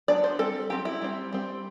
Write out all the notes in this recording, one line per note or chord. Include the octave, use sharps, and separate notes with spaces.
F#3 B3 D4 D5
C5
G3 C4 A4
F#3 C4 G4
E4
G3 C4
G3 C4